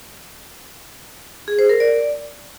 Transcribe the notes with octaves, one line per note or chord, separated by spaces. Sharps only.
G#4
C5
A#4
D5